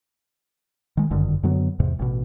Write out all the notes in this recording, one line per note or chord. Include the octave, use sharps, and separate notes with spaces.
D#3 G#3
G1 F#2 D3 D#3
F#2 D3 F#3 B3
E2 G#2 C3
A1 B2